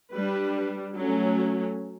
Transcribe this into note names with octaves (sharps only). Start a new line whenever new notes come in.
G3 D4 B4
F#3 A3 C#4